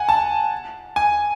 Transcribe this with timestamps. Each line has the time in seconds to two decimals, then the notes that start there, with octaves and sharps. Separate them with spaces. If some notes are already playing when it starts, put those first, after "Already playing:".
Already playing: F#5 G#5
0.09 A5
0.96 G#5